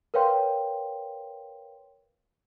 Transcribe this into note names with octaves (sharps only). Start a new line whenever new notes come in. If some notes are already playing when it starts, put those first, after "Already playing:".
A#4 B4 C#5 F5 G5 C6